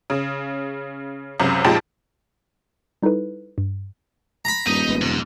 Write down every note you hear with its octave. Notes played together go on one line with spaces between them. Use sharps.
C#3
C#2 F#2 C3
F2 A#2 G#3 D#4 G4 A5
G3 D#4 E4 A4 B4
G2
A#5 B5
D#1 G2 D#4 D#5
G#1 G#3 B3
F2 G#2 C3